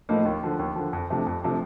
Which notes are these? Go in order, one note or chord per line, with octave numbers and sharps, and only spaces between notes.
A2 F3 A#3 D#4
D#2
D3 F3
D#2
D3 F3
F2
C3 F3 A3 D4
F2
C3 F3 A3 D4